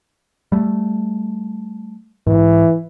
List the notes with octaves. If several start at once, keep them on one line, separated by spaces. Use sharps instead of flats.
G3 A3
G#2 E3